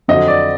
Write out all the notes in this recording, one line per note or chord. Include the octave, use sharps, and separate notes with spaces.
F2 D3 F#3 D#5
D5